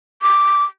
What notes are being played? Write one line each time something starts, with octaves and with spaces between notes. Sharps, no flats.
D6